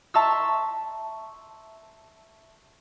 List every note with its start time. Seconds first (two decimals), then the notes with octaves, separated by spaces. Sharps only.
0.14 E5 A5 A#5 C6 C#6 E6